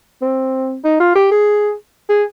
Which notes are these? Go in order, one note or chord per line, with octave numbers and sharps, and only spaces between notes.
C4
D#4
F4
G4
G#4
G#4